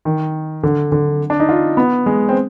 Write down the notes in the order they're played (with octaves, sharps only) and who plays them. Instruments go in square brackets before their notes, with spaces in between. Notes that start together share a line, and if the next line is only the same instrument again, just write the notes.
[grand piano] D#3
D3
D3
D4
D#4
F4
B3
G#3
C4